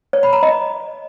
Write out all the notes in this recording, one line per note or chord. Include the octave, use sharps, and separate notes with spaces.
C#5
B5
A#5
D#5